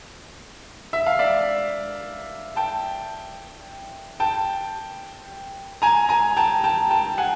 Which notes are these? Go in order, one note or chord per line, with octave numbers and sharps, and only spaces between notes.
E5
F5
D5 E5
G5 A5
G5 A5
G#5 A#5
G#5 A#5
G5 A5
G5 A5
G5 A5
F#5 G#5